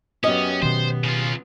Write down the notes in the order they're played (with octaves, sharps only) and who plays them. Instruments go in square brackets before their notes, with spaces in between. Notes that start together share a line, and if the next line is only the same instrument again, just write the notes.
[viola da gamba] F#2 B3 [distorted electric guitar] C#4 [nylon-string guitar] G4 D#5
[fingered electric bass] B2 D#3 [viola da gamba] B3 [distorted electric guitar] C5
[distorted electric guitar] C#3 F4